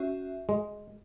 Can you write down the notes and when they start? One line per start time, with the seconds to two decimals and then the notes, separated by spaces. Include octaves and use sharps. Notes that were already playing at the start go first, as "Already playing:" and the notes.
Already playing: C#4 F#4 E5
0.49 G#3